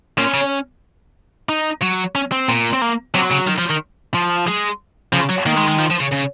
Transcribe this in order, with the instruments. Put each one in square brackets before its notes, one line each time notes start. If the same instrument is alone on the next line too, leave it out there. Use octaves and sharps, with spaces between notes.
[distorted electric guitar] A#2 [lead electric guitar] C#4
[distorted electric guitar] C#3
[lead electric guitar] D#4
[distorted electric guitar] F#3
[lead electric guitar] C#4
C4
[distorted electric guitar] A#2
[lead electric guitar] C4
A#3
[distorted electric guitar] C3 [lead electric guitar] F#3
[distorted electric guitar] C#3
D#3
F3
D#3
[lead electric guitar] F3
[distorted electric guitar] G#3
[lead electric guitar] C#3 [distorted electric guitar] F3
[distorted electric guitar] F#3
[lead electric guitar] D#3 [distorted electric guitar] A#3
[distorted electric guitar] G#3
G#3
F3
F3
C#3
C#3